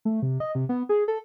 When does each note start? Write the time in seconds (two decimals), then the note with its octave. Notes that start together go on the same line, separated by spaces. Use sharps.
0.05 A3
0.22 C3
0.40 D#5
0.55 C3
0.69 B3
0.89 G#4
1.08 A4